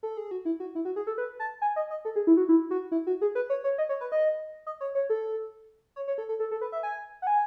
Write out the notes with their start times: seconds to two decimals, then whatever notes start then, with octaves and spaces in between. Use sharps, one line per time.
0.03 A4
0.17 G#4
0.31 F#4
0.45 E4
0.60 F#4
0.75 E4
0.85 F#4
0.96 G#4
1.07 A4
1.18 B4
1.40 A5
1.62 G#5
1.76 D#5
1.91 D#5
2.05 A4
2.16 G#4
2.27 E4
2.37 F#4
2.49 E4
2.71 F#4
2.92 E4
3.07 F#4
3.21 G#4
3.35 B4
3.50 C#5
3.64 C#5
3.78 D#5
3.89 C#5
4.01 B4
4.12 D#5
4.66 D#5
4.81 C#5
4.95 C#5
5.10 A4
5.96 C#5
6.08 C#5
6.18 A4
6.29 A4
6.40 A4
6.51 A4
6.61 B4
6.72 E5
6.83 G#5
7.22 F#5
7.27 G#5